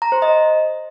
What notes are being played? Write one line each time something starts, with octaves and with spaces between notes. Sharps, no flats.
A#5
C5
D#5